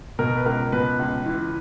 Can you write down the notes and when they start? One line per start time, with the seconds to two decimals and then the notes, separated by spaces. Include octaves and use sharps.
0.19 B2 A#4
0.37 B4
0.46 C#2 A#4
0.72 B2 B4
0.99 C#2
1.26 E3